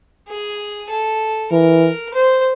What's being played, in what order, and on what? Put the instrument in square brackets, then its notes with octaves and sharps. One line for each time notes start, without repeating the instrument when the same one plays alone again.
[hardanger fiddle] G#4
A4
[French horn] E3 [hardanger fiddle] A#4
[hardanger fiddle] C5